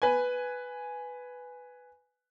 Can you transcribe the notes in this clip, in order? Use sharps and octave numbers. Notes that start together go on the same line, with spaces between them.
B4 G#5